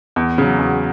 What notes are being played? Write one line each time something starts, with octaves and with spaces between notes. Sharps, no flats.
E2
C#3 F#3
E2